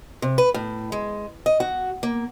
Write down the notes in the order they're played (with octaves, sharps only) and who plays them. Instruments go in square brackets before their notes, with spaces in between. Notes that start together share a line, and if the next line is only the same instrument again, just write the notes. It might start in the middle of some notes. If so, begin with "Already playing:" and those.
[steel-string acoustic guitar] C3
B4
A2
G#3
D#5
F#4
A#3